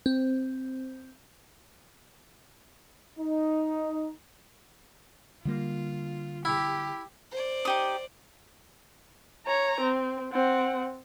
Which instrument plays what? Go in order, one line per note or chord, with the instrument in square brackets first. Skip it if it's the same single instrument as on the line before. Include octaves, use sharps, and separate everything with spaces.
[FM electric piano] C4
[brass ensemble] D#4
[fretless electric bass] D3 G3 A#3 [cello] F4
[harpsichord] E4 [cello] G4
[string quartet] C5 D5
[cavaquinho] D#4 G4 D#6
[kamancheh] C#5 A#5
C4
C4 F#5